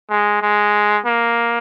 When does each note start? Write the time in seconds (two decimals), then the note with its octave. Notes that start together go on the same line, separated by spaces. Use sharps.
0.10 G#3
0.42 G#3
1.06 A#3